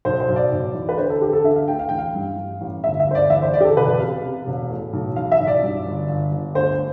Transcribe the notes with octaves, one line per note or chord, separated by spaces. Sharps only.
B1 C5
C5
B1
D5
B1
E3
B4
D3 C5
A4
D3 G4
A4
D3 E5
F5
D2 G5
F5
E3 G5
F5
G2
G2
A1
G1 E5
E5
G1 C5
D5
E3 E5
C5
G1 D5
G4
A4
E1 B4
C3 F5
C3
E1
A2
B1
E3 F5
E5
B1
D5
G2
G1
G1
G1
D2 C5